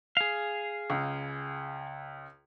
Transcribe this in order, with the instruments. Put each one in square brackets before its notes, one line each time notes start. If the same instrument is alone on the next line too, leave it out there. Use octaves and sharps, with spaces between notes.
[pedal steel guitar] G#4 F5
[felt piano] C#2